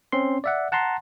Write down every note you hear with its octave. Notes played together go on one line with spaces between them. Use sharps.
C4 C#4 C6
D5 E5 F#5
F#5 A5 A#5 C6